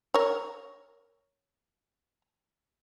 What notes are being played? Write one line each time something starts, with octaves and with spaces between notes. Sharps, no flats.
A#4 C#5